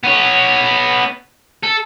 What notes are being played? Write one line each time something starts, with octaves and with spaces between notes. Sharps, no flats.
B3 C#5
A4